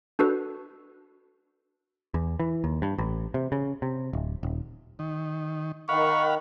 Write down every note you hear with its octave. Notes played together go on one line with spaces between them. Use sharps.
D4 F#4 A4 B4
E2
E3
D#2
G2
A1
C3
C#3
C3
D1
D#1
D#3
D#3 F5 F#5 B5 C#6